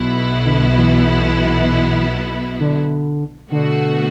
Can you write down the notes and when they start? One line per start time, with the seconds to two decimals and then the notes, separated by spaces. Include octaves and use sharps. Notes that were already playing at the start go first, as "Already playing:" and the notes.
Already playing: B1 B2 B3 E4
0.46 D3
0.77 E3
2.60 D3
3.51 B2 D3 A3 F#4